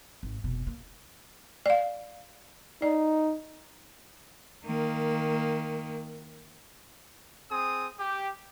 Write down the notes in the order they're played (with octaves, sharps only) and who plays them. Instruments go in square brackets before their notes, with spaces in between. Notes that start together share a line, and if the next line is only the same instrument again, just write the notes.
[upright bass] G#1
F1 B2
A#3
[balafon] D5 F5
[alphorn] D#4 [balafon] D5
[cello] D#3 A#3
[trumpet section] C4 G#4 D#6
G4